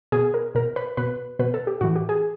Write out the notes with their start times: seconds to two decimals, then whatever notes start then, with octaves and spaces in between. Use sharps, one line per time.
0.12 B2 G#4
0.34 A#4
0.55 B2 A#4
0.76 B4
0.97 B2 B4
1.39 B2 B4
1.54 A4
1.67 G4
1.81 A2 E3 F#4
1.96 G4
2.09 G#4